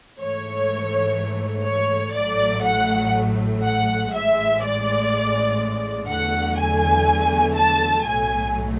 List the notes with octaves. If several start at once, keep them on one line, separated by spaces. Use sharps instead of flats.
G#2 E3 A3 C#5
C#5
A1 A2 F#3 A3 D5
F#5
F#5
A1 A2 G#3 E5
D5
E2 D3 F#3 A3 F#5
G#5
A5
B1 A2 F#3 A3 G#5